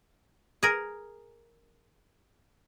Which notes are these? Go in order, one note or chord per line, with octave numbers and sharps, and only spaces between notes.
G#4 A#4